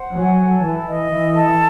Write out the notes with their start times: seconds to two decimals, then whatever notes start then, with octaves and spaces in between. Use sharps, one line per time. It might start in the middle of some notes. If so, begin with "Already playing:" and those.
Already playing: C5 F#5
0.16 F#3 G#5
0.40 A4
0.63 E3 E4
0.87 D#5
1.11 E3 E4
1.34 A4